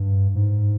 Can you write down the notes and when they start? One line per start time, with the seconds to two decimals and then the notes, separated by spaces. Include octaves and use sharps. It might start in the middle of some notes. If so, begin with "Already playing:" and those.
Already playing: G2
0.35 G#2